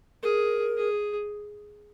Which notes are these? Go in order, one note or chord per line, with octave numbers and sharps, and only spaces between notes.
G#4 A#4
G#4